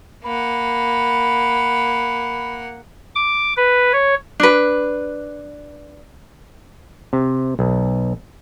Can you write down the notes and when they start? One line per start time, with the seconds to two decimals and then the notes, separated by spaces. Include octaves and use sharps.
0.24 A#3 F#5 B5
3.15 D6
3.57 B4
3.93 C#5
4.40 D4 B4
7.13 C3
7.59 B1